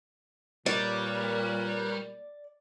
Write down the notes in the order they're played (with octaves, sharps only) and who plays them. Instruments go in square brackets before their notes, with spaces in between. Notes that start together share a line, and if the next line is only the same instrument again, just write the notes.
[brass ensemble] A#2 [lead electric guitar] G3 [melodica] A#4 B4 C#5 [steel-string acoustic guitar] D5